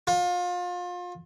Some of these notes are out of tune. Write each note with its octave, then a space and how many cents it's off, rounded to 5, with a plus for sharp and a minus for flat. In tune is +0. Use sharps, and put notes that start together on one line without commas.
F4 +30